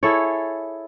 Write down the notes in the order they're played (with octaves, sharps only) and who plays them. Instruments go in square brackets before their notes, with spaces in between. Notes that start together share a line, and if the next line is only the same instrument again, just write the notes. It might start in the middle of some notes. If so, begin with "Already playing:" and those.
[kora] E4 G#4 A4 C#5